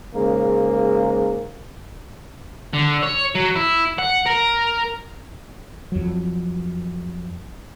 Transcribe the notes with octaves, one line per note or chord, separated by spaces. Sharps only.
G#2 C#3 G#3 A#3
D3
C#5
F#3
E4
F#5
A#4
F2 F#3